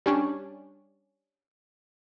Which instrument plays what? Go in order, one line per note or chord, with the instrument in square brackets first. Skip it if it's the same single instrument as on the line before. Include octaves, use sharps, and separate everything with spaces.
[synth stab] G3 C#4 D4